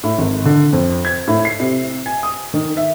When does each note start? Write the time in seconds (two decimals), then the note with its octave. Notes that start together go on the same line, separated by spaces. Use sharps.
0.03 A2
0.19 G#1
0.45 D3
0.73 F2
1.05 G#6
1.28 A2
1.45 C7
1.60 C3
2.06 G#5
2.23 D#6
2.54 D#3
2.77 E5